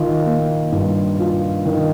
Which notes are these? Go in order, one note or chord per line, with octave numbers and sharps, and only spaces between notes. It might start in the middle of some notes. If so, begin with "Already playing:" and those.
Already playing: D#3 F4
A#3
G2
F4
D#3